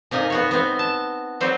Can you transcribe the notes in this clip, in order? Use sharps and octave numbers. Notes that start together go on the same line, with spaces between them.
C3 A#3 D#4 G#5
B3 F#4 C#5
B3 C4
A5
F#3 G3 C4 F#4 C5